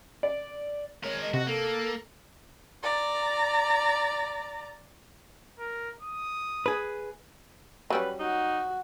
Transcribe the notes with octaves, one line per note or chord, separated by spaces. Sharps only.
D5
G#3 A#4 C#5
D#5
C3 F#4
A#3 A4
D5 A#5
A#4
D#6
G#4 B4
F#3 G3 C#4 B4
D#4 F#4